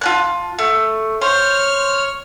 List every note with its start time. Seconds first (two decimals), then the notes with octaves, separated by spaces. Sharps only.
0.01 F4 A5 F#6
0.59 A3
1.21 C5 C#5 F6